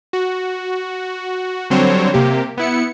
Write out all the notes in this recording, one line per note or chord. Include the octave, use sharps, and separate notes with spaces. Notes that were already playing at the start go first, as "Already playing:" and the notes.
F#4
D3 F#3 G3 C4 C5 C#5
C3 A#3 G4
B3 E4 C#7